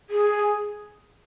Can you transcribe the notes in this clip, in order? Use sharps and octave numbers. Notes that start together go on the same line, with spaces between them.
G#4